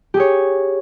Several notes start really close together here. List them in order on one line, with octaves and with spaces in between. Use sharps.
G4 G#4 C#5